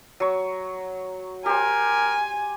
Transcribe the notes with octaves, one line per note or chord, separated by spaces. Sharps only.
F#3 C#6
G4 A#4 C5 G#5